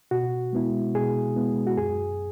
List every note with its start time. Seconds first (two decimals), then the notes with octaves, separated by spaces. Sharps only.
0.11 B2 F#4
0.53 G#3 B3 E4
0.94 B2 G#4
1.36 G#3 B3 E4
1.67 F#4
1.77 F#2 G#4